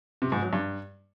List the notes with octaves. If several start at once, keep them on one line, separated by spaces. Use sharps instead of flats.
C3
G#2
F#3
G2